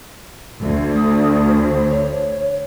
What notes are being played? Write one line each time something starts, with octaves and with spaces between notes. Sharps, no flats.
D2
D#6
C5
C#5